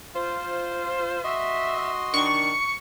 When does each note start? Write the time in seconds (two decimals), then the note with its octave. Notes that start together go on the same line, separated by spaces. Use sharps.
0.15 F4 C5
1.24 F#4 D#5 E5 C6
2.14 D#3 D4 C#6